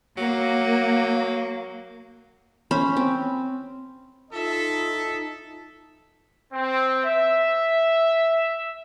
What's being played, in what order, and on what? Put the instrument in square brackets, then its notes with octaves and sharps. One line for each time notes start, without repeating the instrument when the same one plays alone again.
[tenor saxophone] F#3 [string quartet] A#3
[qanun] C#4 C5 B5
C4
[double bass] D#4 [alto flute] F4 [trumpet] A4 [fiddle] E5
[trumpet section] C4
E5